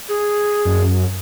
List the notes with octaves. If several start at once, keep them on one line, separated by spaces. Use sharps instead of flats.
G#4
F#2